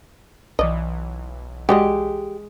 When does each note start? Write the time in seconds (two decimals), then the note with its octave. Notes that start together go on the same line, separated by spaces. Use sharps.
0.59 B1 E3 D5 D#5
1.69 G#3 F#4 G4 D5 D#5